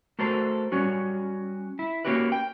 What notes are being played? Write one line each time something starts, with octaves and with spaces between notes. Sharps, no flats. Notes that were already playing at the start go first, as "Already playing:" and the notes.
A3 F#4 A4 A#4 C5
G3 C#4 F#4
E4
A#3 C#4 F#4 G4 B4
G5